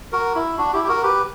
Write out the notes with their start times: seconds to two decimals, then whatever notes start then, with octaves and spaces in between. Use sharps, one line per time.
0.12 F#4 A#4
0.35 E4
0.58 D4 F#4
0.73 E4 G4
0.83 G4
0.88 F#4 A#4
1.03 G4 B4